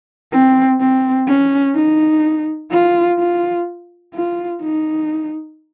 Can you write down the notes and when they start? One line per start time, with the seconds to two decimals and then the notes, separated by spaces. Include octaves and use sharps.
0.31 C4
0.80 C4
1.27 C#4
1.74 D#4
2.71 F4
3.18 F4
4.14 F4
4.61 D#4